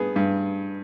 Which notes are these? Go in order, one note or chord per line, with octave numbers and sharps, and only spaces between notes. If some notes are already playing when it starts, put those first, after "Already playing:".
Already playing: G2 B3 G#4
G2